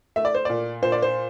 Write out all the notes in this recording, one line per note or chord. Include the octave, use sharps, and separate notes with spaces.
A3 E5
D5
C5
A#2 D5
A#2 C5
D5
C5